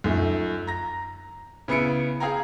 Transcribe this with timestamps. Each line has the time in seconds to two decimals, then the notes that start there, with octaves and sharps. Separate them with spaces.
0.04 F#2 F3 A3 D#4
0.67 A#5 A#6
1.68 C#3 B3 E4 C#7 D7
2.20 G#4 F5 G5 G#5 A#5